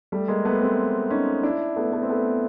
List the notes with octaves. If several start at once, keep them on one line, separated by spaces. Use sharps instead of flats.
G3 A3
G#3 A#3
A3 B3
A#3 C4
C#4 D#4
D4 E4
A3 B3
A3 B3
C4
A3 B3